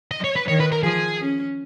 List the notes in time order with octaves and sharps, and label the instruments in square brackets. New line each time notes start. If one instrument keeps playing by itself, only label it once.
[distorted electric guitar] D#5
C#5
B4
[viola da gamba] D#3 [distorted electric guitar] C#5
[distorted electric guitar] B4
A#4
[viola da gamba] F3 [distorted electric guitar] G#4
[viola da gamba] C#4